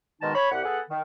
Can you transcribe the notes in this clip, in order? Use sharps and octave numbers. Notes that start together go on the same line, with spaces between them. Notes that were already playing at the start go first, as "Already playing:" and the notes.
G#2 B2 D#3 G#3 D#4 A5
C#5 B5
C2 G4 F#5
B3 G#4 A4 B4 F#5
D#3